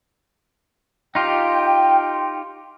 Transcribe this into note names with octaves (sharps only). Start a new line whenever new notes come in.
D#4 F4 G4 G5